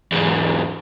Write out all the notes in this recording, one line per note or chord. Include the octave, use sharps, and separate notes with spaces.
E2 G#2